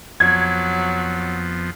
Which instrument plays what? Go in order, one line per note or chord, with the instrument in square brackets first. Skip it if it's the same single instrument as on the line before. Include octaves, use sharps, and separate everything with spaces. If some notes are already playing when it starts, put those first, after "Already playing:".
[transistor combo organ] F2 F3 B3 [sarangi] F#3 [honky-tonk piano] G#6